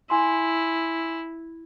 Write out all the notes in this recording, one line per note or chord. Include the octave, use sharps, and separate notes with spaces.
E4 G#5 C6